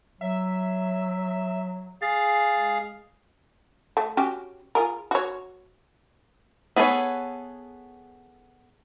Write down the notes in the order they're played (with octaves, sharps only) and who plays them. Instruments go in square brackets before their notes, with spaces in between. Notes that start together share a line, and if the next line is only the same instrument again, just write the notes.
[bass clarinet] F#3 [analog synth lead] E5
[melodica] G#4 F5 [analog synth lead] A6
[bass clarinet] G#3
[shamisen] A3
C#4 F#4 G4
F4 G#4 A#4
F#4 C#5
[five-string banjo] B3 G#4 A4 B4 C#5